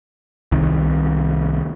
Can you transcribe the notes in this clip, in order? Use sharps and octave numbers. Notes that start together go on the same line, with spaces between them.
C2 C3 D#3